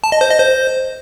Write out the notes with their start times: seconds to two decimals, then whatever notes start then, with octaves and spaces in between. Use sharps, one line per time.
0.04 A5
0.12 D#5
0.21 C5
0.30 D#5
0.39 C5